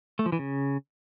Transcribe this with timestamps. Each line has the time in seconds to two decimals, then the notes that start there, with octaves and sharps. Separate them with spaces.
0.19 A3
0.26 F3
0.32 E3
0.39 C#3